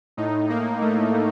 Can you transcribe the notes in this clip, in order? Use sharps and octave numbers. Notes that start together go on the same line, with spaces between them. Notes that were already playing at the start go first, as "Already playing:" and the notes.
A2 D#4
A#3
A3